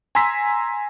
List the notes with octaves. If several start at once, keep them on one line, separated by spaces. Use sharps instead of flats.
G#5 A#5 C6 E6 B6